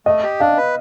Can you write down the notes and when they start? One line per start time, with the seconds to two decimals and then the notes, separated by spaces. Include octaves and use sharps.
0.06 A3 D#5
0.23 G4
0.40 D4 F5
0.57 B4